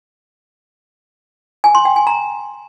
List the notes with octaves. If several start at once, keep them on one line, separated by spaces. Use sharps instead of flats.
G#5
C6
G5
G#5
A#5